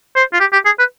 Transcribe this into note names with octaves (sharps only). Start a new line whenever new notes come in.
C5
F4
G4
G4
G#4
B4